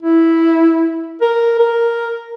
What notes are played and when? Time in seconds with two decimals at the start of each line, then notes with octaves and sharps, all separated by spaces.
0.03 E4
1.21 A#4
1.60 A#4